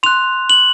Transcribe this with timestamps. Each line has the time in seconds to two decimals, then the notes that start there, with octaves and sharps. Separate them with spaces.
0.03 C6 F#6 F7
0.50 F#7